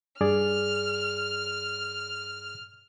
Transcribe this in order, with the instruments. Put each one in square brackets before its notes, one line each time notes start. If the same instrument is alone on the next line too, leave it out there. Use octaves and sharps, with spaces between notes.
[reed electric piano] G2 G#4 D5 [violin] F6